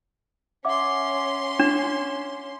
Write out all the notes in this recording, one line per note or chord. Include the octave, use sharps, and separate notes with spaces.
C#4 E5 F#5 C6 D6
D4